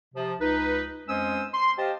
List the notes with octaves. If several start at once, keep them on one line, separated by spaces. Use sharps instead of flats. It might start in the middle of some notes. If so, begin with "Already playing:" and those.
C3 F3
C#2 D#4 B4
F2 G#3 C#4 C5 D#6 E6
C6
G4 C5 D#5 F5 G5 A5